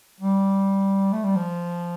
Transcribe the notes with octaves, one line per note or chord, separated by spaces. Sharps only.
G3
A3
G3
F3